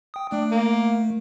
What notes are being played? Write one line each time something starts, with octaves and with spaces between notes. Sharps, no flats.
G5 D#6
A3 D4
A#3